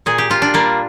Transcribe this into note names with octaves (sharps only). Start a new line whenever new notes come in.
A#2 G#4
G4
A#2 F4
D4
G3 A#3